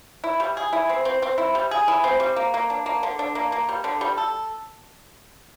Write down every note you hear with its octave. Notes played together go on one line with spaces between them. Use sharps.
E4
G3
G#4
E4
C4
C4
C4
E4
G3
G#4
E4
C4
G3
A#3
A#3
D4
A#3
D3
D4
A#3
A#3
G3
D3
G3
A4